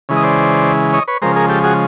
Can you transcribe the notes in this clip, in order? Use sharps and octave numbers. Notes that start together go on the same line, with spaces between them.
C#3 E3 G#3
D#5
C5 D5
C#5 D#5
B4 C#5
C#3 F3 G#3 A#4 C5
G#4 A#4
G4 A4
F#4 G#4